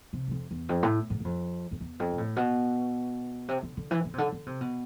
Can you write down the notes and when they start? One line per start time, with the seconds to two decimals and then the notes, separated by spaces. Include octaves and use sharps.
0.13 C3
0.27 E2
0.31 F2
0.51 E2
0.69 F2
0.83 A2
1.10 G#2
1.20 G#2
1.25 F2
1.71 F2
1.80 E2
2.00 F2
2.12 B2
2.18 A2
2.36 B2
3.48 C3
3.63 D3
3.77 D3
3.91 E3
4.05 D3
4.14 C3
4.18 D3
4.32 D3
4.46 C3
4.61 B2